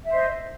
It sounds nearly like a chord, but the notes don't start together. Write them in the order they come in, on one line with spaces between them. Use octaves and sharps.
E5 C5 D#5